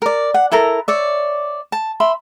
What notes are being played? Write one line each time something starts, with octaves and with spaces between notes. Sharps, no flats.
A#4 D5
F#5
E4 A4 A#4 A#5
C#5 D5 E5
A5
E5 B5 C6